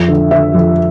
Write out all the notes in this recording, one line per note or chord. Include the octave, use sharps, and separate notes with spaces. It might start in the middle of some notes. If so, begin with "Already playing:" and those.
Already playing: F2 E5
D3
D3 E5
F2